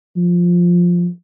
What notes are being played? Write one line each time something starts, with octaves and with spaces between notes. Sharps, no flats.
F3